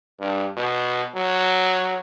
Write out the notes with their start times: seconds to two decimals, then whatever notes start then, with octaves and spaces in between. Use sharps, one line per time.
0.20 G2
0.57 B2
1.15 F#3